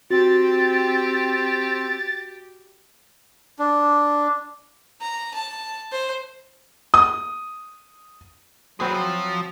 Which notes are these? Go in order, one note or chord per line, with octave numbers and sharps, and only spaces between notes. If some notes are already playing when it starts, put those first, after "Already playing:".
C4 F#4 G4 A6
D4
A#5
A5
C5
D#6
F#3 C4 F#4 G#4 B4
F3